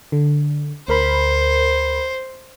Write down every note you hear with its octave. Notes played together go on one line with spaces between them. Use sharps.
D3
D2 A#4 C5 B5